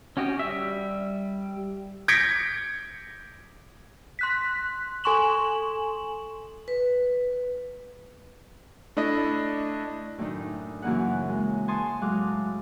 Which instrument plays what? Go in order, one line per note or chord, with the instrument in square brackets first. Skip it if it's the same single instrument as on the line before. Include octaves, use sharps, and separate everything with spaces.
[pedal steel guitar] C#4 F#4 G4 D#5
G3 E5
[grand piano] G6 G#6 A#6 B6 C#7 D7
[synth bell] C6 F#6 B6
A4 G#5 C6 C#6 E7 F#7
[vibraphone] B4
[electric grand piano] A3 D4 E4 D#5
[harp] F#2 A2 D#3 D4 D#4
F#2 C#3 E3 A#3 G#4 F#5
G#3
G#5 A5 C6 C#6 D#6
A2 F#3 G#3 F5 D6 F#6